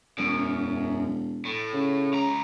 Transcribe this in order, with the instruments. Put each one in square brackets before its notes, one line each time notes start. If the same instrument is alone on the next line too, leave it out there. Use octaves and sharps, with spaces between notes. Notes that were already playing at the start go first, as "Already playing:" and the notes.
[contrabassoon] E1 [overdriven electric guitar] F#2
[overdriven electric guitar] A2
[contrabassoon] C#3
[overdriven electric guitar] C#2 A#5